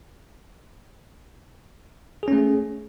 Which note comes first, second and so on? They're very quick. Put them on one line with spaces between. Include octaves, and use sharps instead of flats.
G#4 C#4 A3